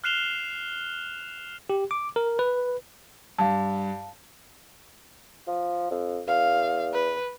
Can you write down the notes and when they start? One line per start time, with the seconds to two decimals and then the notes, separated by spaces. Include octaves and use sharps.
0.04 F6 F#6 C7 E7 F7 G7
1.70 G4
1.91 D6
2.16 A#4
2.39 B4
3.39 G2 F5 A5
5.47 F3
5.91 F2
6.27 E2 F5
6.93 B4